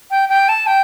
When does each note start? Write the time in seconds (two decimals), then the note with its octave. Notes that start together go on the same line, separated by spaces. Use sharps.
0.11 G5
0.29 G5
0.49 A5
0.67 G5